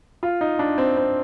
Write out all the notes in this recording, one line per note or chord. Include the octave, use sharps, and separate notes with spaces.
F4
D#4
D4
C4
C4